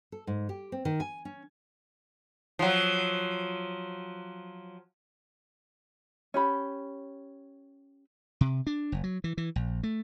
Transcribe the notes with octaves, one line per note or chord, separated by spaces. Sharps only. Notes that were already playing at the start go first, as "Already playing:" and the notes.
A4
G#2
G4
C4
D#3
G#5
C#4
F3 F#3
C#4 G4 B5
C3
D4
F#1
F#3
E3
E3
A#1
A3